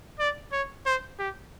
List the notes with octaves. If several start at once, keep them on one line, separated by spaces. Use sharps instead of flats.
D5
C#5
C5
G4